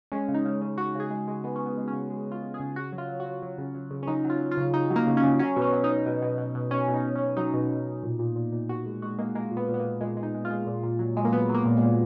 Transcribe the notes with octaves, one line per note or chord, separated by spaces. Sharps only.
G#3 C#4
C#3
D#4
C#3
C#3
C#3 F#4
C#3 G#4
G#3
G#3
G#3 B3
G#3 C#4
B3
G#3
C#4
C#3
G#3
C#3 F4
G#3
G#4
C#3
C#3 F#4
F#3
F4
F#3
F#4
F#3
F#3
C#3
F#3
C#3
C#4
F#3 D#4
F#3
F4
F#3
F4
C#3
C#3 D#4
F#3
A#3
C#3
C#4
C#3
F#3 C#4
B2
C#4
F#3 C#4
D#4
B2
B2
B2
B2
B2
B2 C#4
B2
D#4
B2
C#4
B2
F#3 D#4
B2
B2
B2
A#2
A#2
A#2
A#2
A#2 F#4
G#3
G#3 F#4
G#3 A#3
G#3 A#3
A#2
B3
A#2
B3
G#3 A#3
A#2 G#3
G#3
D#4
G#3
F4
G#3
A#2
A#2
F#3
F#3 G#3
A#3
F#3 B3
F#3
A#3
A#2
G#3
A#2